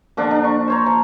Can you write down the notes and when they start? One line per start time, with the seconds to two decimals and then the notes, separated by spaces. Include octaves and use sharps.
0.17 A#2 D3 F3 D4
0.31 D4
0.44 C#6
0.68 C5 C#5 A#5
0.86 F3